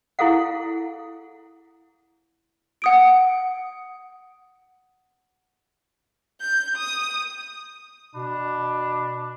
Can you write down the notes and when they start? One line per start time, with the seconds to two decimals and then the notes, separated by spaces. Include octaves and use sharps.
0.19 E4 G#4 A4 F5 F#5
2.82 F#5 D#6 D7
6.41 G6
6.76 D#6
8.15 B2 D4 B5